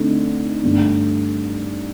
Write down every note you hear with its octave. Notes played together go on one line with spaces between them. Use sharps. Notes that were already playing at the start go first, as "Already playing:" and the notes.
Already playing: D3 A3 C4 D#4
G2 D3 A3